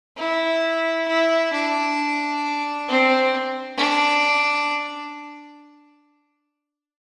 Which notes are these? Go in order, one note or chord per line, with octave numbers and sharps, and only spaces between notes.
E4
E4
D4
C4
D4